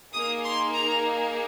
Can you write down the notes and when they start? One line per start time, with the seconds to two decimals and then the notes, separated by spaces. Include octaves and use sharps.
0.13 A#3 D#4 G#4 D#6
0.44 C6
0.73 A#5